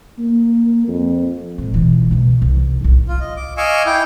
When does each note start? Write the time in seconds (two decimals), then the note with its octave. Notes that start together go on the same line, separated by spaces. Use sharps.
0.18 A#3
0.88 F2
1.58 A2 G#3
1.74 B2 E3
2.11 C#2 B2
2.42 C2
2.81 C2 A2
3.08 F4
3.20 D#5
3.37 D6
3.57 D#5 F5 G#5 C#6 D6 E6
3.86 E4 G5 D6